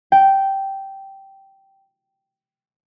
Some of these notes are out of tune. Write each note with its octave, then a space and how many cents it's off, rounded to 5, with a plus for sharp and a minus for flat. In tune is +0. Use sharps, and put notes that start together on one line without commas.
G5 -10